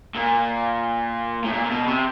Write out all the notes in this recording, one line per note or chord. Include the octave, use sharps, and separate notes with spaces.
A#2
A2
A#2
A#2
B2
C3